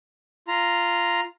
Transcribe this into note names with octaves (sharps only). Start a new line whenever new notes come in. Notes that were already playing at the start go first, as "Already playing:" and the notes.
F4 A#5